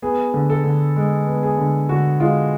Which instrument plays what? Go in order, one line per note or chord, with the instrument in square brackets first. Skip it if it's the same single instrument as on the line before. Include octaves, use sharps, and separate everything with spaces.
[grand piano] B3 G#4
D3
A4
D3
G#3
B3
G#4
D3
D3 F#4
G#3 F4